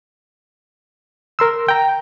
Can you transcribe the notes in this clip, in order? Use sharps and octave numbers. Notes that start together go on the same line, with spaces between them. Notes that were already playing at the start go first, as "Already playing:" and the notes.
A#4 C6 E6
G5 A#5